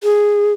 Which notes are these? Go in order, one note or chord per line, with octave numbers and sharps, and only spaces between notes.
G#4